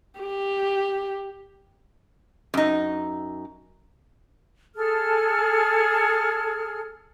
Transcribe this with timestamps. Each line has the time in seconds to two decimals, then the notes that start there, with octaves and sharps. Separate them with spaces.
0.20 G4
2.54 F#2 D#4
4.75 G#4 A4 F6